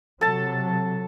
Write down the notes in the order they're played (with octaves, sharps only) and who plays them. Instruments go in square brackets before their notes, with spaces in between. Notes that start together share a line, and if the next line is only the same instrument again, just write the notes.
[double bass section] C3 F#3 [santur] A4 A5